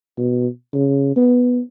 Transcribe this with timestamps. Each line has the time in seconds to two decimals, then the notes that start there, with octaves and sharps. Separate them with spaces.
0.18 B2
0.74 C#3
1.16 B3